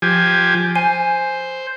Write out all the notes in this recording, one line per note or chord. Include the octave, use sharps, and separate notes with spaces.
F3 G4 G#5
C5 G#5